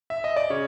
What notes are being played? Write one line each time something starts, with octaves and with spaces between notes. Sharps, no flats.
E5
D#5
D5
C#3 C#5